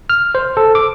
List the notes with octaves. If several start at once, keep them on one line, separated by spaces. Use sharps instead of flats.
F6
C5
A4
D6